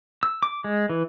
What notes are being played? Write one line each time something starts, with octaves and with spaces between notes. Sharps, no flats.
E6
D6
G#3
E3